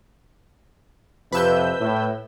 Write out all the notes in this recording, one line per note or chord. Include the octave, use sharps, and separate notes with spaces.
F2 C3 B4 E6 G6
A2